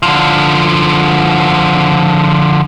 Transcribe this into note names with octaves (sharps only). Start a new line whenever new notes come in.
D3 F3